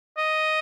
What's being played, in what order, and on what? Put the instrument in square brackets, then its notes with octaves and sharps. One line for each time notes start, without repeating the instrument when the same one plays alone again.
[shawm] D#5